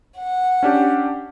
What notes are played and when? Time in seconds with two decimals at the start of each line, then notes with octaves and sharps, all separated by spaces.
0.18 F#5
0.63 C#4 D4 G4